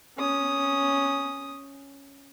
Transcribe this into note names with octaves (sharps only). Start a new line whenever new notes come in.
C#4 D#6